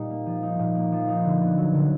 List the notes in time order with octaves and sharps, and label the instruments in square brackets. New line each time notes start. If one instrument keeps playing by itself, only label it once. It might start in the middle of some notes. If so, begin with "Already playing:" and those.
Already playing: [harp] A#2 G3 D#4
A#3
F3
D#4
A#2
A#3
F3
D#4
D3
B3
F#3
D3